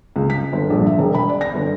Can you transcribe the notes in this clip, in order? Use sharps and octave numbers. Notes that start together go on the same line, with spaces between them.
C#2
B6
G1
A#1
E5
E1
B5
D5
A#6
G1